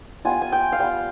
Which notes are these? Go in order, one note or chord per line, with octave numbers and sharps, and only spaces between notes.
G3 B3 F4 G#5
G#5
G5
F5
G3 B3 F4 G5